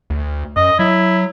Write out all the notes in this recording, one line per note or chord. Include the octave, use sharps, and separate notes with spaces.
D2
F#2 D#5
F#3 E4